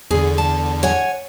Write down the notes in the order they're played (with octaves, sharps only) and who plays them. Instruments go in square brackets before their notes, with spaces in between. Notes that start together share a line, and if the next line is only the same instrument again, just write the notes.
[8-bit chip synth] E2 D3 [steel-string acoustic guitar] G#4
[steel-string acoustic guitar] A5
C#5 F#5 G#5